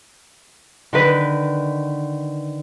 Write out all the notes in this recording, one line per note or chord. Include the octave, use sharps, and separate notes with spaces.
D3 D#3 B4